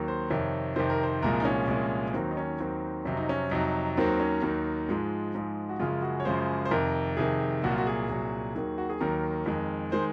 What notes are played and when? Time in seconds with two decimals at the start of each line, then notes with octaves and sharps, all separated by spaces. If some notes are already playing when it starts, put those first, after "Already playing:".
Already playing: D#2 D#3 F#3
0.08 C5
0.30 F2 C3 D#3 C#5
0.76 F2 C3 D#3 C5
0.90 A#4
1.03 C5
1.22 C2 A#2 F3 G#3 A#4
1.40 D#4
1.45 C#4
1.67 C2 A#2 F3 G#3
2.13 D#2 D#3 F#3 C4
2.31 D#4
2.37 C#4
2.60 D#2 D#3 F#3 C4
3.05 F2 C3 F#3 C#4
3.17 D#4
3.29 C#4
3.51 F2 C3 F#3 D#4
3.97 D#2 D#3 F#3 C4
4.20 C#4
4.42 D#2 D#3 F#3
4.89 G#2 F3 G#3
5.35 G#2 F3 G#3
5.69 F#4
5.79 F#2 C#3 F3 G#3 F4
6.02 F#4
6.20 C#5
6.25 F#2 C#3 F3 G#3 C5
6.65 C5
6.71 F2 C3 D#3 A#4
7.17 F2 C3 D#3 G#4
7.63 C2 A#2 F#3 F#4
7.71 F4
7.78 F#4
7.87 G#4
8.09 C2 A#2 F#3
8.55 D#2 D#3 F#3
8.78 F#4
8.90 G#4
9.00 D#2 D#3 F#3 A#4
9.46 F2 D#3 G#3
9.92 D#3 G#3 C5